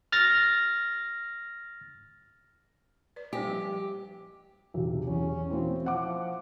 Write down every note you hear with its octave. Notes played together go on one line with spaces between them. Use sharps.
F6 A6 A#6
B4 D5
G3 G4 C5 G#5
F3
B1 E2 C3
E2 C#4
E3 A#3 C4 F#4
F3 E5 F#5 D6